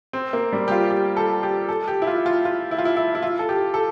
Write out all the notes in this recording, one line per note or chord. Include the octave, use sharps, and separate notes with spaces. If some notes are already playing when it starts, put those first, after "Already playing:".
C4
A#3
G3
G4
F4
G4
A4
G4
A4
G4
E4
F4
F4
F4
E4
F4
E4
E4
E4
F4
A4
G4
A4